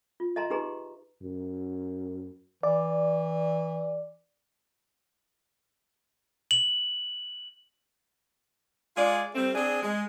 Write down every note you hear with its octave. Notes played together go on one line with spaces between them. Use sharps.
F4
D#5 E5 A5 A#5 C6
D#4 G4 G#4 B4 A#5 C6
F#2
E3 D5
F#7
G#3 F4 G#4 D5
G3 A3 C4
C4 D4 G#4
G#3